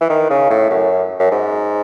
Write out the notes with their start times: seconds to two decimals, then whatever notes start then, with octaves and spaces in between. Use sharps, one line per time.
0.01 E3
0.09 D#3
0.30 C#3
0.50 A2
0.70 F#2
1.19 F#2
1.31 G#2